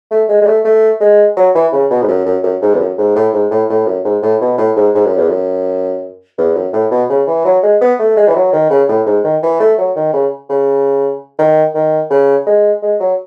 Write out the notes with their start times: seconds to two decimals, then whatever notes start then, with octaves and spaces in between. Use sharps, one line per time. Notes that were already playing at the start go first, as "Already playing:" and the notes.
0.11 A3
0.29 G#3
0.42 G#3
0.47 A3
0.65 A3
1.01 G#3
1.37 F#3
1.55 E3
1.73 C#3
1.91 B2
2.02 G#2
2.08 F#2
2.25 F#2
2.43 F#2
2.62 G#2
2.74 E2
2.80 F#2
2.98 G#2
3.16 A2
3.33 G#2
3.51 A2
3.70 A2
3.87 F#2
4.05 G#2
4.23 A2
4.41 B2
4.58 A2
4.76 G#2
4.95 G#2
5.06 F#2
5.17 E2
5.29 F#2
6.38 E2
6.55 F#2
6.73 A2
6.91 B2
7.10 C#3
7.28 E3
7.45 F#3
7.63 G#3
7.81 B3
7.99 A3
8.17 G#3
8.28 E3
8.35 F#3
8.53 D#3
8.70 C#3
8.89 A2
9.06 G#2
9.24 D#3
9.43 E3
9.60 A3
9.78 F#3
9.96 D#3
10.13 C#3
10.50 C#3
11.39 D#3
11.75 D#3
12.10 C#3
12.46 G#3
12.83 G#3
13.00 F#3